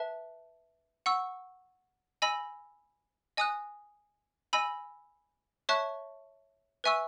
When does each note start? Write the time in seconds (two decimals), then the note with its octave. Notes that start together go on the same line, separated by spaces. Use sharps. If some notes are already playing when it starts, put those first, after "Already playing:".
Already playing: B4 E5 A5
1.06 F#5 C#6 E6
2.22 D#5 G#5 B5 E6
3.37 D#5 G#5 D#6 F#6
4.53 D#5 G#5 B5 E6
5.69 C#5 E5 A5 C#6 F#6
6.84 B4 E5 G#5 C#6 E6